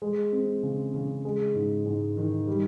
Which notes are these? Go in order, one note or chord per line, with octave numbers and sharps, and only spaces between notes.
G#3
C4
C#3
C#3
G#3
G#2
G#2
D#3
G3